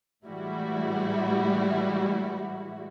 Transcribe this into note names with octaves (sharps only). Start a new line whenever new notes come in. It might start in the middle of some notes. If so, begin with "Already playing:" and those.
A2 E3 G3 G#3 E4 F#4